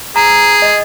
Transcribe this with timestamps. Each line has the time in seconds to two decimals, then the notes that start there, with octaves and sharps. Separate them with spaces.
0.16 G#4 A#5
0.62 D#5